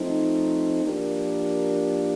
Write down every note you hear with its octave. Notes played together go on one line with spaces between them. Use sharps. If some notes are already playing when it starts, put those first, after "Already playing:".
Already playing: F3 A3 C4 D#4
F3 A#3 D4 G4 A#4